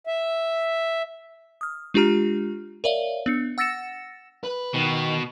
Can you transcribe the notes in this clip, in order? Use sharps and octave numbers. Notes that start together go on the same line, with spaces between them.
E5
D#6 F6
G#3 D4 F4 G4 A#5 F6
A#4 C#5 D5 E5 F5
B3 D4 C#7
F#5 E6 A6 A#6 C#7 E7
B4
B2 D#3